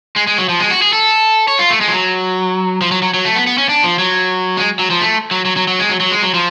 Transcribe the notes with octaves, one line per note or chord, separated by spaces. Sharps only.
G#3
G#3
F#3
F3
G#3
F#4
G#4
A4
C#5
F4
A3
G#3
F3
F#3
F3
F#3
F#3
F#3
A3
B3
B3
C#4
D4
F3
F#3
G#3
F#3
F3
A3
F#3
F#3
F#3
F#3
G#3
F#3
F#3
G#3
F#3
F3